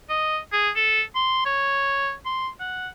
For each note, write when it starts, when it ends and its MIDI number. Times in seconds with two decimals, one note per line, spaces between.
0.10 0.38 75
0.52 0.70 68
0.76 1.02 69
1.15 1.43 84
1.46 2.13 73
2.26 2.49 84
2.60 2.88 78